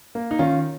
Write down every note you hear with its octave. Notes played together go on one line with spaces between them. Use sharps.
A#3
D#4
D#3 C#4 F4